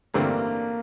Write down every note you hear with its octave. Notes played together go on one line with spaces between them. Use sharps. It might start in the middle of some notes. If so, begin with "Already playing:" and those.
A1 G2 D3 A3 A#3 C4